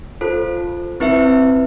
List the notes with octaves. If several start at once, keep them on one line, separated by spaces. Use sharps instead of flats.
F4 A4 C5
C4 E4 B4 E5